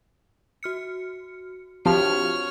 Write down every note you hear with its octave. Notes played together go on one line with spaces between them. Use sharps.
F#4 F6 C#7
F3 C4 D4 F#4 G4 C#5 F6